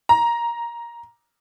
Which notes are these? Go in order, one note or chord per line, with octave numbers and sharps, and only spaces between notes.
A#5